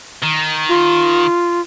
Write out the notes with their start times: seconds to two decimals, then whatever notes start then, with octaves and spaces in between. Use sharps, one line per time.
0.23 D#3
0.69 F4